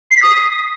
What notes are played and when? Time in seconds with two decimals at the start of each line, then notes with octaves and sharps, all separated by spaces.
0.11 C7
0.16 B6
0.22 D#6